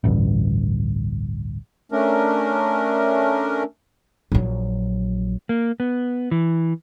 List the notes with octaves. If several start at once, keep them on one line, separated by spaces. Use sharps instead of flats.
A1 D2 G2
A3 C#4 D4 A#4
A#1 F#3
A#3
B3
E3